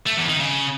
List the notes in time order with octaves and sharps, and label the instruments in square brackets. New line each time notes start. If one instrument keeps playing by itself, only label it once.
[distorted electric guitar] A3
E2
D#3
C#3